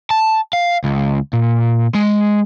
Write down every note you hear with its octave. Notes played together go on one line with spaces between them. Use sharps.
A5
F5
C#2
A#2
G#3